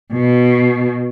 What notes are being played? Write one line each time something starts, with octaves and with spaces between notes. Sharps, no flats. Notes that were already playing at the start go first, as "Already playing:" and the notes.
B2